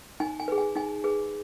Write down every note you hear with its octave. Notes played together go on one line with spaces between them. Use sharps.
D#4 G#5
G#5
G#4 B4
G#5
D#4 G#5
G#4 B4